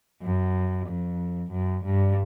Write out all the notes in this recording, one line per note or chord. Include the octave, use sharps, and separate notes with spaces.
F#2
F2
F#2
G2